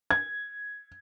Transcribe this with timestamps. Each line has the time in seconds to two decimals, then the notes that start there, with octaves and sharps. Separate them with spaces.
0.11 G#6